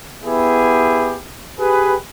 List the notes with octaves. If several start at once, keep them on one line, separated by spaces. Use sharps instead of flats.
B3 E4 G4 G#4
G4 G#4 B4